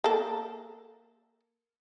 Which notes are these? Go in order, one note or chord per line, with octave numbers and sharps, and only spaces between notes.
A#3 A4